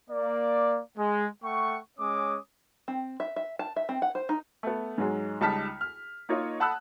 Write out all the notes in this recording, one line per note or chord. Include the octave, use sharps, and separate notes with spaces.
A#3 D5
G#3
A3 F#5 G5 C#6
G#3 C#4 C#5 D6 D#6
C4
E5
E5
A5
E5
C4
F#5
C5
D#4
A3 B3
G#2 F#3 G#3
C#2 G3 D#4 A5 F6 B6
F6
A#3 D#4 F4 C#5 D#5
F#5 A5 B5 D#6 E6 F#6